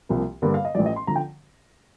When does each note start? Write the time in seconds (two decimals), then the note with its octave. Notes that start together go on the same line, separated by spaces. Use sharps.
0.09 C2 C3 F3 A#3
0.42 G2 D3 G3 A#3
0.54 F5
0.65 D#5
0.75 A1 A2 F3 D5
0.86 D#5
0.96 C6
1.07 D3 F3 A#5
1.16 G5